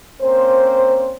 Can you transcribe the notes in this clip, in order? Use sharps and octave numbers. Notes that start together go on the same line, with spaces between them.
A#3 C4 C#4 C5